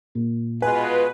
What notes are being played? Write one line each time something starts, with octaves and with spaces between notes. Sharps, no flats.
A#2
B2 G#3 F4 B4 G#5